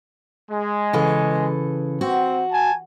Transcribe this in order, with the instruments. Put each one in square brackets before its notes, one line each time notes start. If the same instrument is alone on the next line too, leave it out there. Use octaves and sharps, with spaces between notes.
[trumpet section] G#3
[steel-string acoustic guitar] C#3 E3 A4
[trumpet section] C4 [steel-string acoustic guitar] F#4
[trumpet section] G#5 A5